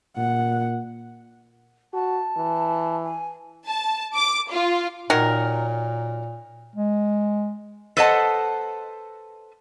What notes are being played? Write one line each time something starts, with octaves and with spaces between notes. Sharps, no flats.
A#2 F#5
F#4 A5
E3
G#5
A5
D6
F4
A#2 D#3 F#3 A#4
G#3
A4 B4 C5 D#5 F#5 A5